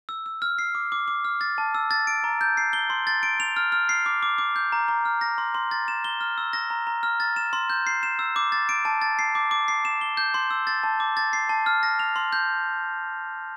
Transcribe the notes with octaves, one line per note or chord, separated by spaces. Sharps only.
E6
E6
F6
C7
D6
D6
D6
F6
A6
A5
E6
A6
D7
A#5
G6
C7
G7
C6
A6
D7
F7
F6
F6
C7
D6
D6
D6
G6
A#5
A#5
F6
A#6
C6
C6
A6
E7
G7
F6
E6
A#6
A#5
A#5
F6
A6
E7
C6
G6
C7
E7
E6
D6
A6
D7
A5
A6
C7
D6
D6
C7
E7
G7
G6
C6
E6
A6
A5
D6
A6
C7
A5
F6
A#6
F7
C6
G6